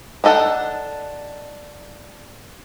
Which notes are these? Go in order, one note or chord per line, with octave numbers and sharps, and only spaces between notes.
D4 D#4 A4 F#5